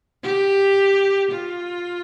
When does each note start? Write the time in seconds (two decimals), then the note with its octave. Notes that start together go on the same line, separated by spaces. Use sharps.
0.23 G4
1.32 F4